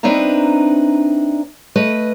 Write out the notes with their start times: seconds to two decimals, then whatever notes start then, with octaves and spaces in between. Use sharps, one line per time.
0.03 C4 D4 D#4 B4 E5 A#5
1.76 A3 B4 D#5